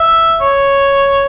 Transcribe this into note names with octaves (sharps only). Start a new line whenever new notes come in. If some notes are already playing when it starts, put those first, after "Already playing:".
Already playing: E5
C#5